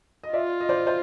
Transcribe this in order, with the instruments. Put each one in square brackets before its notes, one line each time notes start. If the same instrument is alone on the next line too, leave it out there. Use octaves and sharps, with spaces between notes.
[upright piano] D#5
[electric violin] F4 [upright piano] D5 E5
[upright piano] D#5
C5 D5
C5